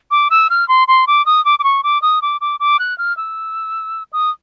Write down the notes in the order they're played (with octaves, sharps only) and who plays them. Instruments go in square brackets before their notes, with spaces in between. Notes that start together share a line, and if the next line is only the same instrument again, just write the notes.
[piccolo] D6
E6
F6
C6
C6
D6
D#6
D6
D6
C#6
D6
D#6
D6
D6
D6
F#6
F6
E6
D#6